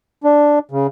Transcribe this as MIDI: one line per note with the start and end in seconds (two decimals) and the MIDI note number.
0.24 0.59 62
0.71 0.87 49